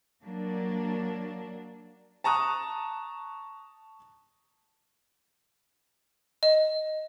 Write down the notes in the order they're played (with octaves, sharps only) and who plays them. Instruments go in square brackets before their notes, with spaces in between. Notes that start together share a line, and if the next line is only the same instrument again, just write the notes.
[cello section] F#3 A#3 D4
[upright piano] A5 A#5 C#6 D#6 F#6
[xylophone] D#5